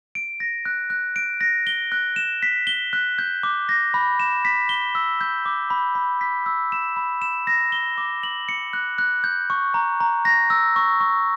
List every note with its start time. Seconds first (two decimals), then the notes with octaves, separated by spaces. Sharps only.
0.15 D7
0.40 A#6
0.65 F#6
0.90 F#6
1.16 D7
1.41 A#6
1.67 G7
1.92 F#6
2.16 E7
2.43 B6
2.67 G7
2.93 F#6
3.18 G6
3.43 D6
3.69 A#6
3.94 B5
4.20 E7
4.45 B6
4.69 G7
4.95 E6
5.21 G6
5.46 D6
5.70 B5
5.95 B5
6.21 B6
6.46 E6
6.72 E7
6.97 B5
7.22 E7
7.47 A#6
7.72 G7
7.98 D6
8.23 F#7
8.49 C#7
8.73 F#6
8.98 F#6
9.24 G6
9.50 C#6
9.74 A#5
10.00 A#5
10.25 A#6
10.50 E6
10.76 C#6
11.01 C#6